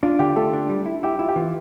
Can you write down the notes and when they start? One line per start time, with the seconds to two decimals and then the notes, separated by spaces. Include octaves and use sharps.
0.03 D4 F4
0.19 D3 G4
0.36 A3 A4
0.53 D4
0.70 G3
0.86 E4
1.03 E4 G4
1.19 E4 F4
1.28 G4
1.36 E3 F4